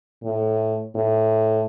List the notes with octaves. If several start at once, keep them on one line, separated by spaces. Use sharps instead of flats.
A2
A2